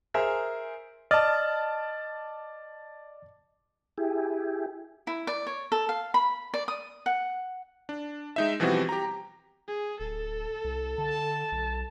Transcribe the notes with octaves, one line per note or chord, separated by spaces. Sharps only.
G#4 A#4 C5 E5
D5 D#5 A5 F6 A6
E4 G4 G#4
E4
D5
C#5
A4
F5
B5
D5
D#6
F#5
D4
G#3 D#4 E5
B2 E3 F3 G3 C4 F#4
G4 A#5
G#4
D1 A4
C2
D3 A5
B1